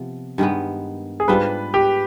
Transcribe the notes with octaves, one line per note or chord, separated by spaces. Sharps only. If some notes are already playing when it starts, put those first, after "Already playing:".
Already playing: C3 F3 B3
G2 D#3 G#3 B3
G#4
G#2 G3 D4 F4 B4
G4